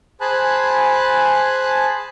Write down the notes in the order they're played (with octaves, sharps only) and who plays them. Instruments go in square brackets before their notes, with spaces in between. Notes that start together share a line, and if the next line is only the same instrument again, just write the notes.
[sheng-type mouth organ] G#4 C5 G#5 A5 B5 F#6